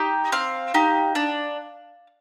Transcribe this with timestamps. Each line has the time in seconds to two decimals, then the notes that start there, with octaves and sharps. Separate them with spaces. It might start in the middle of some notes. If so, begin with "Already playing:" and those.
Already playing: D#4 G4
0.32 C4 F5
0.74 D#4 G4
1.15 D4